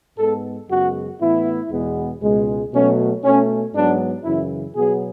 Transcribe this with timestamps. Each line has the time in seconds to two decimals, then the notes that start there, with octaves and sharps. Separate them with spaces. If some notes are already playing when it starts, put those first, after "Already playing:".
0.17 G#2 G#3 B3 A4
0.68 F#2 C#3 G#3 B3 F#4
1.19 A2 E3 B3 E4
1.70 E2 B2 G#3 B3
2.21 C#2 B2 G#3
2.71 B2 F#3 A3 C#4
3.23 B2 A3 C#4
3.74 G#2 F#3 B3 D4
4.24 F#2 C#3 E3 E4
4.75 B2 F#3 B3 G#4